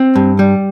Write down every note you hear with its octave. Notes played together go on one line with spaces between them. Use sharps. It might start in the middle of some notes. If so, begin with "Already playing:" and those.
Already playing: C4
G2
G3